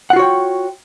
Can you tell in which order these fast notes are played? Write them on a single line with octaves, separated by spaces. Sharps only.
F#5 F4 F#4 C#5 G5